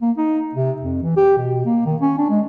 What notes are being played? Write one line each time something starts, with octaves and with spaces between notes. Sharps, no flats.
A#3
D#4
C3
F2
E3
G4
B2
A#3
D#3
C#4
D4
G#3